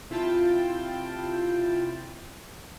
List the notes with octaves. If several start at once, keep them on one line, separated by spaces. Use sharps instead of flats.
C3 E4 F4 G5 A5